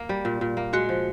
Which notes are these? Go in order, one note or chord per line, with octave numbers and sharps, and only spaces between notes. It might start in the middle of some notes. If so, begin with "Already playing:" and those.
Already playing: A#3
G3
A#2
A#2
A#3
G#3 F#4
F3